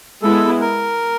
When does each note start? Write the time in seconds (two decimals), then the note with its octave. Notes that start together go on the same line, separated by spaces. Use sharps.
0.22 G#3 B3 E4 A4
0.61 A#4